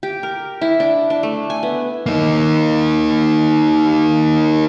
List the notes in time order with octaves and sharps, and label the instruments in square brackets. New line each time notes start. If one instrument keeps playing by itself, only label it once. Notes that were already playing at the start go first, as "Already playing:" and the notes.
[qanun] G4
A#4
E4
D4
D4
A3
G#5
B3
[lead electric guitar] A#3 D#4